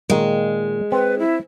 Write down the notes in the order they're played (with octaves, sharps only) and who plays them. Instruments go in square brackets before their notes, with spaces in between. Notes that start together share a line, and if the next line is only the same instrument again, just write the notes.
[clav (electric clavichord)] A#2 D#3 [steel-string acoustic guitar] G#3
[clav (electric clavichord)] C4 [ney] B4
[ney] E4